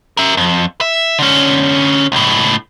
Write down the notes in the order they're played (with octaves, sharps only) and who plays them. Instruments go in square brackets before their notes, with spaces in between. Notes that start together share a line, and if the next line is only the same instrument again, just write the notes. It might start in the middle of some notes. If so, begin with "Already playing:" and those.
[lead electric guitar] A#4 E5
F2
E5
D3 C#4
C#2 A2